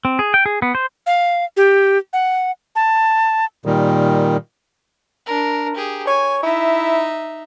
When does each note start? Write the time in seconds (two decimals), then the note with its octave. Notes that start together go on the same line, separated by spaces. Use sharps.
0.05 C4
0.19 G#4
0.34 G5
0.46 G#4
0.62 B3
0.75 C5
1.07 F5
1.57 G4
2.13 F#5
2.76 A5
3.66 A#2 D#3 G3
5.26 D4 A#4
5.75 G4 G#4
6.07 C#5 G#5
6.43 D#4 E4 E5